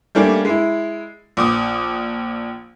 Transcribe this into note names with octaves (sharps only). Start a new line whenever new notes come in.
G3 A3 A#3 C#4 D4
G#3 E4
A#1 D6 D#6